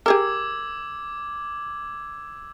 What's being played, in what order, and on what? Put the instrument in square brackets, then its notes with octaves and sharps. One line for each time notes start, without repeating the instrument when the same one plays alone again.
[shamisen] G4 G#4 A#4 [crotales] D6 E6 G#6